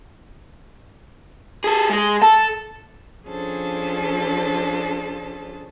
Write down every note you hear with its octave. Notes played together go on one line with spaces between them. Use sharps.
G#4 A4
G#3 G#4
A4 A5
F3 C#4 D4 G#4 A4 C5